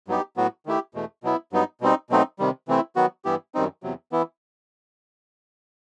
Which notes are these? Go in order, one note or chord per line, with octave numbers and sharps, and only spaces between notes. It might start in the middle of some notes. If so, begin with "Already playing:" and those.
G2 F#3 B3 D#4 G4
A2 F#3 B3 F#4
D#3 A3 E4 G4
E2 B2 A3
B2 F#3 B3 E4
G2 F#3 B3 D#4
B2 G3 C4 D#4
B2 F#3 A3 C4 D#4
C3 D#3 G3
C3 E3 A3 C4 E4
D#3 F#3 B3 F#4
G2 E3 B3 E4 G4
F#2 D#3 G3 C4 D#4
E2 C3 F#3
E3 B3 E4